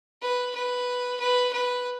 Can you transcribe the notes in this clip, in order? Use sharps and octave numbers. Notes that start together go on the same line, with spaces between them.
B4
B4
B4
B4